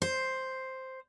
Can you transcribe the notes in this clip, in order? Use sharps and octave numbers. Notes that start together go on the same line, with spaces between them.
C5